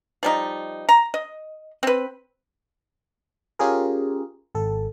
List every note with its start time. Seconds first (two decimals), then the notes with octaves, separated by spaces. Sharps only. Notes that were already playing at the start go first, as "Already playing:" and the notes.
0.23 F3 G3 D#4
0.89 A#5
1.14 D#5
1.83 C4 B4
3.59 C#4 F4 G4 G#4 A#4
4.55 G#1 A4